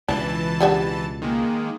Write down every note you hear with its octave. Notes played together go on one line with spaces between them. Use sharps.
C#2 B2 E3 D4 A5
G3 D4 F#4
D#3 G#3 A#3